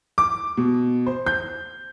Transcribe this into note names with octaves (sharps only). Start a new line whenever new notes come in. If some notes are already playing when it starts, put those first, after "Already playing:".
D6
B2
C5
G6